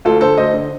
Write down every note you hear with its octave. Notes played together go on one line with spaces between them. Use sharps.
D2 F4 A4
D3 A4 C5
D2 C5 D#5
D3